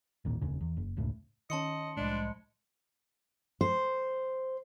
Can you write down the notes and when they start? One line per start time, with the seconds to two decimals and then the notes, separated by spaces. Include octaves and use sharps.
0.25 A1 D#2 A#2
0.41 F1 D#2 C#3
0.61 E2
0.77 F#1
0.97 F1 C#2 A2
1.50 D#3 C#4 D#5 A5 C6 C#7
1.97 C2 A2 F3 G3 G#3 D4
3.61 C5